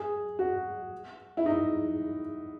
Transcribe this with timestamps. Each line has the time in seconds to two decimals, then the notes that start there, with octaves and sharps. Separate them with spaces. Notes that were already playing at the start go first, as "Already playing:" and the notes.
Already playing: G#4
0.39 F#4
1.37 E4
1.46 D#4